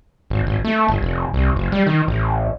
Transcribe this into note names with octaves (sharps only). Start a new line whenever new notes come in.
G#1
G#1
A3
G1
F1
C2
F#1
G3
D#3
A1